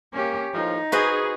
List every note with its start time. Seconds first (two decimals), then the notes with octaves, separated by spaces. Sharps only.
0.13 A#3 C#4 G4
0.53 D#2 A2 F3 D#4
0.92 F#4 G#4 B4 C5